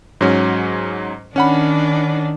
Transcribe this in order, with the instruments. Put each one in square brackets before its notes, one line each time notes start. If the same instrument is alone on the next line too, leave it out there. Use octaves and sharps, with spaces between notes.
[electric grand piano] G#2 F#3 C#4
[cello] D#3 D4 [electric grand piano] C#4 F#5 B5